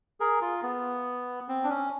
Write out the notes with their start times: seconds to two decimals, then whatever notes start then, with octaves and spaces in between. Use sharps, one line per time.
0.20 G#4 A#4
0.41 F4
0.63 B3
1.48 C4
1.64 D4
1.70 C#4